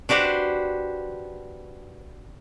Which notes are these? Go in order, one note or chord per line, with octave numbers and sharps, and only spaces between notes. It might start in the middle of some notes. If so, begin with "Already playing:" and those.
D4 F#4 G4 B4 C5